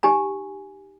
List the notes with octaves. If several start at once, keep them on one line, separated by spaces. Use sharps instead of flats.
D#4 G4 G#5 A#5